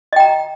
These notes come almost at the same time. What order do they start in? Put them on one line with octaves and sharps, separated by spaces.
D#5 G5 A#5